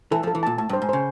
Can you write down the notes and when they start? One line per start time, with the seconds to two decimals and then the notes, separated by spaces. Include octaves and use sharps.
0.11 E3 A4
0.23 F3 A4
0.35 E3
0.43 A#2 A5
0.58 A2 A5
0.69 G2 C5
0.82 G#2
0.89 C#3 C5